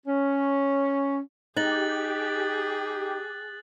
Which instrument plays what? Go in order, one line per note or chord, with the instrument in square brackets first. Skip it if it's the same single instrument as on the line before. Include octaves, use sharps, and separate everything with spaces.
[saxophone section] C#4
[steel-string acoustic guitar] D#4 [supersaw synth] G4 [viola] G#4 [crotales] F#6 A6 F#7